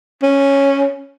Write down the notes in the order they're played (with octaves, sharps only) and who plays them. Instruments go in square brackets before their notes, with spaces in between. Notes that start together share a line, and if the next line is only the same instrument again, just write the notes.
[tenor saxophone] C#4